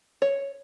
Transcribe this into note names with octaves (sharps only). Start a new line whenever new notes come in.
C#5